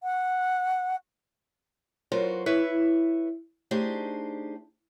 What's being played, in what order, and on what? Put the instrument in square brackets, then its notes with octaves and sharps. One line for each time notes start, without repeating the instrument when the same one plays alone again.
[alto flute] F#5
[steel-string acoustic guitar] F#3 B3 F4 F#4 A#4 C5
E4 B4 C#5 E5
A3 D4 D#4 G4 G#4 C5